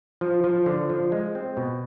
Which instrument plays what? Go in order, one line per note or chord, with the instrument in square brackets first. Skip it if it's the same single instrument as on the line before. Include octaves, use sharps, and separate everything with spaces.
[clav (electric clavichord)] F3
F3
D3
F3
G#3
C4
B2